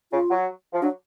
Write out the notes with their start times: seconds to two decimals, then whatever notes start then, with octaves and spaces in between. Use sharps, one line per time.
0.12 C#3 F4
0.31 F#3
0.73 F3
0.82 F#3 D4